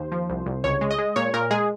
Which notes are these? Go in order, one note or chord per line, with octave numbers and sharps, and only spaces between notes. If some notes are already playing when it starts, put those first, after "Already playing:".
Already playing: D#2 C5
F3
C2
C2
C#2 C#5
G#3
D#5
G#3
A#2 C#5
A#2 A#4
G#3 G#4